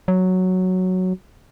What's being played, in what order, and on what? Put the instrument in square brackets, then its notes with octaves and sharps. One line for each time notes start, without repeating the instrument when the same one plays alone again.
[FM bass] F#3